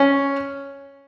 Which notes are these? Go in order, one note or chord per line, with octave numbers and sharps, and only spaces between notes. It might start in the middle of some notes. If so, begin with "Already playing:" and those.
Already playing: C#4